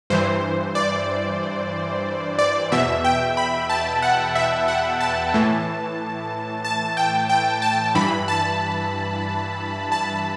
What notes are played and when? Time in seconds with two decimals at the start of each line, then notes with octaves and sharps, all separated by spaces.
0.10 G2 E3 C5
0.75 D5
2.39 D5
2.72 E2 B2 E5
3.05 G5
3.37 B5
3.69 A5
4.02 F#5
4.35 E5
4.68 F#5
5.01 A5
5.34 A2 E3
6.65 A5
6.97 G5
7.30 G5
7.62 A5
7.95 G2 E3 B5
8.28 A5
9.92 A5